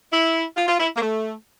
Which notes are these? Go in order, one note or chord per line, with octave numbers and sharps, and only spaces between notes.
E4
F4
F4
E4
A#3
A3